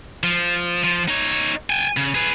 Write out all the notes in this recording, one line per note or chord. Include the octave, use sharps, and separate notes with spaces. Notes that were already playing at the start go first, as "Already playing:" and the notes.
F3
F3
D#4 C#5
G5 G#5
C#3
G#4 B4